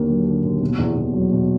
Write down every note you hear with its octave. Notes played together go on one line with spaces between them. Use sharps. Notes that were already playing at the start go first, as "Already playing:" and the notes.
Already playing: D#2 D3 A#3
F#3
D3
D#2
B2
E2
E2
F#3
B2